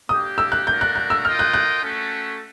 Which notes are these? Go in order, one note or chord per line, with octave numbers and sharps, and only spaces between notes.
A#3 D4 G4 D#6
E6
F#6
A3 D4 F#4 A#4 D5 G6
F#6
F#6
E6
F4 A#4 D#5 G5 F6
F#6
F#6
A3 C#4 F#4 A4